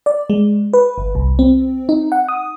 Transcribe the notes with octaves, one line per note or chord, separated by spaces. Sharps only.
D5
G#3
B4
G1
C2
C4
D#4
F#5
D#6